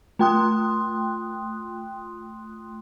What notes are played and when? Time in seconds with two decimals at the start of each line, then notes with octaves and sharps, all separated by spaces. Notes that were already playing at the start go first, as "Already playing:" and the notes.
0.19 A3 F4 G5 C6 D#6 F#6